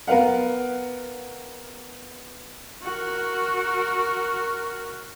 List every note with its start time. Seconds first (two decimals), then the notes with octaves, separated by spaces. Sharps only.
0.07 B3 A#4 B4 F5 F#5
2.82 F#4 A#4